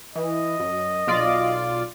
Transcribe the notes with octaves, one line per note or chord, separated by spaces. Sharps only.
E3 D#5
F#2
B1 F4 D5